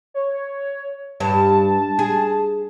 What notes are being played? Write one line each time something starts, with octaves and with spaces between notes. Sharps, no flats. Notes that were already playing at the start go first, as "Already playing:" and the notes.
C#5
G2 A5
G#4